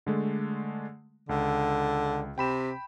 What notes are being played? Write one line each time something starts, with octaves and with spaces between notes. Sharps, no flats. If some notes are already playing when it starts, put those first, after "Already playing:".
D3 G#3 A3
C#2 D3
C3 G5 B5 E7